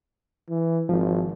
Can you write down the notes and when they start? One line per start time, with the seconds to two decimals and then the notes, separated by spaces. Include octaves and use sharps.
0.49 E3
0.89 G#1 F3